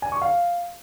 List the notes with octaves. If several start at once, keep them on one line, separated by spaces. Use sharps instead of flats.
G#5
C#6
F5